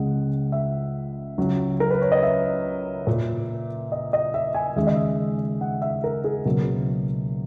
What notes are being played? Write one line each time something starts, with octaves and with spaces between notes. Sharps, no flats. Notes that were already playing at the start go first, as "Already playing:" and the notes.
Already playing: C#2 C#3 G#3 F#5
E5
C#2 C#3 F#3
A#4
B4
C#5
D#5
E5
A#2 A#3
D#5
D#5
E5
G#5
D#2 C#3 G#3 E5
D#5
E5
F#5
E5
A#4
G#4
C#2 B2 F#3 A#3